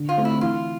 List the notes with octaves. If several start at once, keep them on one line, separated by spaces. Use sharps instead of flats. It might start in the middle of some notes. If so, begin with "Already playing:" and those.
Already playing: D3
F4
A3 C4
E4
E3 F4